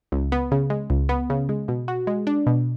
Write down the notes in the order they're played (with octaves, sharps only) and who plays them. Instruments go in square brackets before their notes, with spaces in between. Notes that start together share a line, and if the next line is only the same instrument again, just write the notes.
[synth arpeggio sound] C#2
B3
C#3
G#3
C#2
B3
C#3
G#3
B2
F#4
G#3
D4
B2